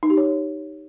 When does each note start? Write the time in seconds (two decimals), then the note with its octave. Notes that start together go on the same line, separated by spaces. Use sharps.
0.03 D#4
0.10 G4
0.17 C#5